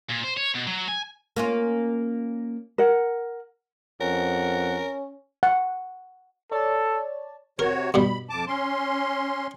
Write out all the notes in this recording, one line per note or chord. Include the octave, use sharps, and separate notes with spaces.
A#2
C5
C#5
B2
F#3
G#5
A#3 C#4 F4
A#4 F#5
F2 C#4 A#4 F#5
F#5
A4 C#5 D5 A5
C3 F#4 A#4 C#5
G2 B2 G3 B5
F2 A5 D6
C#4 C6